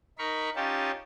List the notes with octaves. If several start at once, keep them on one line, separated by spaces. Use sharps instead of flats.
D#4 A#4 B5 C#6
C#4 D#4 F4 G4 A5